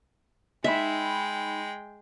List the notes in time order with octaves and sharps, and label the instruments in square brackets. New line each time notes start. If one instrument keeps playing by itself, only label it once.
[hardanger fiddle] G#3 G5 [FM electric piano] D#4 B5 [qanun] E5